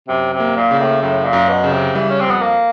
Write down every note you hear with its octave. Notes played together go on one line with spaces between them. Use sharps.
F#2 C3
C3
A#3
A#2
C#3
A2
F#2 A2
A#2
F#2
B2
C#3
C3
E3 G3
C#4
C4
F2 B3
A#3